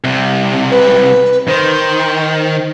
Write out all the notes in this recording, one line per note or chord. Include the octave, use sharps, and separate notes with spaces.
C2 C3
B4
D#3 C5